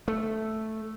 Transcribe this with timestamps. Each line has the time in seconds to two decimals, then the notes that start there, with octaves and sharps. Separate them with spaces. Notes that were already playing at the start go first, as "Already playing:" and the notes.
0.08 A3